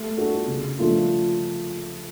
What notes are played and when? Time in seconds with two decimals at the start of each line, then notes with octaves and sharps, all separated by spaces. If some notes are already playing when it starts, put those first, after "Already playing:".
Already playing: A3
0.17 D4 F#4 A4
0.48 C#3
0.79 F3 A3 D4 F4